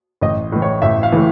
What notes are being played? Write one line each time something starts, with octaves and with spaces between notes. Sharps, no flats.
A1 D#5
A2 E3
C#5
A1 E5
F5
A2 E3